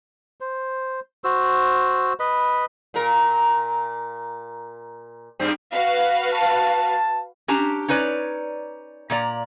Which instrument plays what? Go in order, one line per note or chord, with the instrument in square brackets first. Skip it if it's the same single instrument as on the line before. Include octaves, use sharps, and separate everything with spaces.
[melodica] C5
F#4 C5 E6
B4 D#5 B5
[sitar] A#2 A#4
G2 G3 C4
[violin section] F#4 B4 F5
[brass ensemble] A5
[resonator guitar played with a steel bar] C#4 D4 G4 A5 A#5
C#4 D#4 B4 C#5 D5
A#2 A#3 D5 A#5